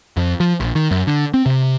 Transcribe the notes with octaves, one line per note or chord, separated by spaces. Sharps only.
F2
F3
A#1
D#3
F#2
D3
C4
C3